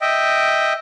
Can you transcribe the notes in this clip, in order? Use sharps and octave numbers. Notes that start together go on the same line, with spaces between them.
D#5 E5 G5